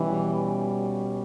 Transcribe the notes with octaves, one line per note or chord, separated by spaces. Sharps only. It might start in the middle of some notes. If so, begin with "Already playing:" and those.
Already playing: B2 E3 G3 C#4